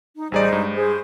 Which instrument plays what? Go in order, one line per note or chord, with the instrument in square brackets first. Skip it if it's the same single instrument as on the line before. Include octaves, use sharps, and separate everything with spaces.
[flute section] D#4
[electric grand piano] A1 G#4 D5 [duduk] G3 [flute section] D#4 C5
[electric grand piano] G2 [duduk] G#3
[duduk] G#4 [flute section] C5